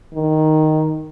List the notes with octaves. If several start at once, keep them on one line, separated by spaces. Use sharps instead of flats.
D#3